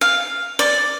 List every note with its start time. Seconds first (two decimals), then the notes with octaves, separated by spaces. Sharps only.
0.01 F5
0.59 D5